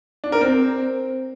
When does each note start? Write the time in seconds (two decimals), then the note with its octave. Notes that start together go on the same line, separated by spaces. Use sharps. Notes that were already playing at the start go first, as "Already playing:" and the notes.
0.24 D4
0.32 A#4
0.41 C4